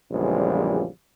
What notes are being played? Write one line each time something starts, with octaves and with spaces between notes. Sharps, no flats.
A#1 E2 C#3 F3 G3 G#3